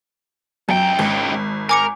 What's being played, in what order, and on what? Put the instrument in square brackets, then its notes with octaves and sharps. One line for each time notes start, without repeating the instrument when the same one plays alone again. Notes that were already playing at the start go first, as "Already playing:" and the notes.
[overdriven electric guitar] C#2 G5 [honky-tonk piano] F#2
[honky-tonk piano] G#1
[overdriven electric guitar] A#4 [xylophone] G#5 D6 C#7